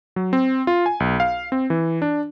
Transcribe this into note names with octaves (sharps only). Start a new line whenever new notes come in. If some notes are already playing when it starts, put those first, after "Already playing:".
F#3
C4
F4
G#5
B1
F5
C4
E3
D4